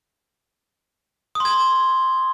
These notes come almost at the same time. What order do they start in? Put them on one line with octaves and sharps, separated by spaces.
D#6 C6 G#6